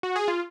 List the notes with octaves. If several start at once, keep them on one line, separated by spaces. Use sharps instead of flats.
F#4
G#4
F4